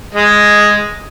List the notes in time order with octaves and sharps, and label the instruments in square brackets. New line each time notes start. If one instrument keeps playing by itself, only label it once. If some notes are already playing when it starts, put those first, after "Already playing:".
[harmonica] G#3 D#5